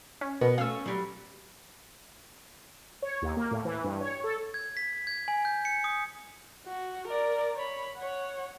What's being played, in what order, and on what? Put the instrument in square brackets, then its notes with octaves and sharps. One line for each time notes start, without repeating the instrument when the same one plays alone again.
[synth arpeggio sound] C#4
[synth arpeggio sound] B2 [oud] B3 A#4 B4
[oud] A3 C#4 [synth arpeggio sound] F5 E6
[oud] F#3 G3
[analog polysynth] C#5
D#2
A#3
A2
E3
G2
C#5
A4
[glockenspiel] G#6
B6
G#6
G#5
G6
C#7
D#6
[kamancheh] F#4
A#4 D5
C#5 B5
C#5 F#5